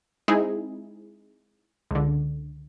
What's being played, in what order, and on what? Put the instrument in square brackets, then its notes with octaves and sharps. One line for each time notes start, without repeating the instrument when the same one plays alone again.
[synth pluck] G#3 C4 D#4 E4 G#4
C#2 D3